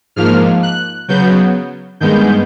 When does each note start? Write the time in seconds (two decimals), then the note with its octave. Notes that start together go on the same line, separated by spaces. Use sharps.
0.16 G#2 F3 A#3 F6
0.63 F#6
1.08 C#3 F#3 B3 G6
2.00 G2 D#3 G#3 B3 G6